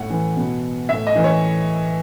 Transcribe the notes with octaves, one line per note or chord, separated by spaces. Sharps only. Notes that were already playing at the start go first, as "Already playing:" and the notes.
Already playing: A2 F#5
E3
B2
A2 E5
D#5
E3
C#5